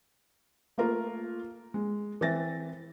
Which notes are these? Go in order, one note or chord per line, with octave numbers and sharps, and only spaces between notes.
A3 A#3 F4 A#4
G#3
E3 C4 E5 A6 A#6